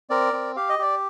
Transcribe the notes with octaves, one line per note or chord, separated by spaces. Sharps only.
C4 A#4 D5
C4
G4 F5
D#5
G4 D5